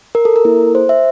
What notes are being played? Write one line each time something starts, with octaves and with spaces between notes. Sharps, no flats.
A#4
A4
A#4
A#3 E4 A4
C5
E5